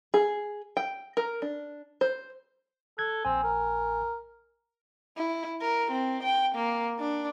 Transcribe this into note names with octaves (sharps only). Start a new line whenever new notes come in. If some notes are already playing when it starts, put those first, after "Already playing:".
G#4
G5
A#4
D4
C5
A4 F#6 G#6
A#1 C4 G#5
A#4
E4
A#4
C4
G5
A#3
D4